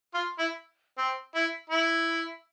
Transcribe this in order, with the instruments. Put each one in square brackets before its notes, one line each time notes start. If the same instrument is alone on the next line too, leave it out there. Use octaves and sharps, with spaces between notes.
[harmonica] F4
E4
C4
E4
E4